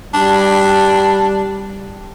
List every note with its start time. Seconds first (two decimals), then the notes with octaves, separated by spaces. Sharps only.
0.14 G3 D4